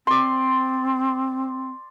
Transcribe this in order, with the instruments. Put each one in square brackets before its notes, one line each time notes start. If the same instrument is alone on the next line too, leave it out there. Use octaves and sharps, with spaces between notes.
[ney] C4 [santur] D5 C6